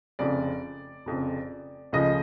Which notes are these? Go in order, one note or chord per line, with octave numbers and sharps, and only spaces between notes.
F1 F2 C#3 D5
F1 F2 C#3
C#2 C#3 F3 A3 D#5